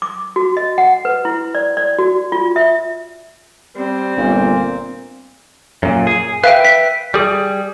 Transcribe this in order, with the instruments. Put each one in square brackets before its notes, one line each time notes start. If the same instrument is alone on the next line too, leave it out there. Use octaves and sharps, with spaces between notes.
[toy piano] D6
F#4
D#5
F#5
B4
E4
D5
D5
F#4
F4
E5
[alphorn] G3 [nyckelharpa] C4
[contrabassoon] G1 [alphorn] A#2
[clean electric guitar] F#2 A#2
G#4
[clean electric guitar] B4 E5 G5 [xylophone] F5
[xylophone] B6
[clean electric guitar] G3 G#4